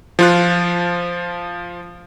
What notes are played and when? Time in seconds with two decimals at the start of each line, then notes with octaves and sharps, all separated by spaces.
0.19 F3 F4 F#6